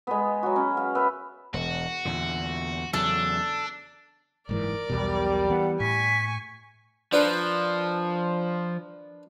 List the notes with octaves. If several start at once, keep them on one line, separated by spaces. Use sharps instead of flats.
G#3 B3
F#3 F#4
C#4
F5
B3 B4 E5
E1 F#4
E2 A#2 D3
E2 C#3 F#3 D4 A4
F#1 G#2 E3 A#4 D5
B1 E2 B2 G3
E3 B3 F#5
A2 G#5 C#6 B6
F3 D4 A#4 B4